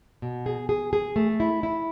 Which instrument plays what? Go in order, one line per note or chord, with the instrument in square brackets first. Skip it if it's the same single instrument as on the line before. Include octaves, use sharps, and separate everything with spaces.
[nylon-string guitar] B2
G#4
G#4
G#4
A3
E4
E4